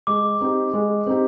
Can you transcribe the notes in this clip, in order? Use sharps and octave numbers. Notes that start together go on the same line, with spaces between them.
G#3 D6
C4 D#4 G4
G#3
C4 D#4 G4